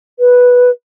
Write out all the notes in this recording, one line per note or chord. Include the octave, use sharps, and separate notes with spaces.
B4